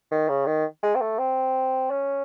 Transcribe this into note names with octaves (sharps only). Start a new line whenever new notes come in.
D#3
C#3
D#3
G#3
C4
A3
C4
C#4